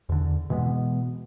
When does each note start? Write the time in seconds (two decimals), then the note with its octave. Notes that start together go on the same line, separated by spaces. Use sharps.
0.09 E2 D3
0.50 B2 E3 G#3 B3